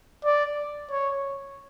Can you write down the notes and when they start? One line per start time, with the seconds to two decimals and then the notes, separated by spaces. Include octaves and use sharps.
0.25 D5
0.91 C#5